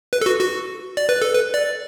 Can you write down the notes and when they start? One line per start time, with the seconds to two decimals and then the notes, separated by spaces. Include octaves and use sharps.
0.13 B4
0.21 A4
0.26 F#4
0.41 F#4
0.97 D5
1.09 B4
1.22 A4
1.34 B4
1.54 D5